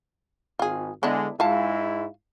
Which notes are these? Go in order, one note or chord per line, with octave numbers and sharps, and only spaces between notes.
G#1 F4 G#4
D3 G#3 B3 D4 E4
G#2 G#3 E4 F4 F5 A5